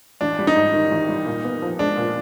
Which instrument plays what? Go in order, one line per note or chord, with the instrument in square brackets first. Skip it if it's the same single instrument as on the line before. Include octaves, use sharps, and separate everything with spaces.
[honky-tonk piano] A1 [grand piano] D4
[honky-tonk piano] G3
[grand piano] D#4
[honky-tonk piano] G#2
D#3
A1
G3
A#2
B3
F3
[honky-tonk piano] G#3 [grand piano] D4
[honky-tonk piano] A#2